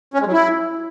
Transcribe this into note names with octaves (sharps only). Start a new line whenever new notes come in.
C#4
G#3
F#3
E4